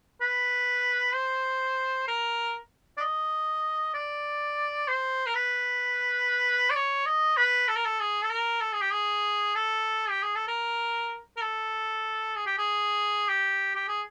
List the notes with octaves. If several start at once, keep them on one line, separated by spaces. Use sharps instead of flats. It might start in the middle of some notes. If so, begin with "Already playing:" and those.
B4
C5
A#4
D5
D#5
D5
C5
A#4
B4
D5
C#5
D#5
B4
A4
A#4
A4
G#4
A4
A#4
A4
G#4
G4
G#4
A4
G4
G#4
A4
A#4
A#4
A4
G#4
G4
G#4
G4
G4
G#4